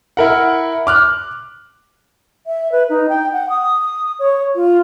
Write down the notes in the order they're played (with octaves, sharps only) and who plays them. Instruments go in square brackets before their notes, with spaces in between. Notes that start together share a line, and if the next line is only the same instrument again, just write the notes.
[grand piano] E4 A#4 F#5
D6 F6 F#6
[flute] E5
B4
D#4
G5
F#5
D#6
C#5
F4